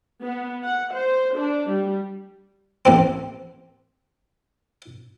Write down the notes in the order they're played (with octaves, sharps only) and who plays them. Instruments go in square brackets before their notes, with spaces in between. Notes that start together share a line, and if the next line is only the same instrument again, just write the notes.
[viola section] B3
F#5
C5
D4
G3
[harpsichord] A1 A#3 C4